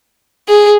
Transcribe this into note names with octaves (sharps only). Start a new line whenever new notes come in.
G#4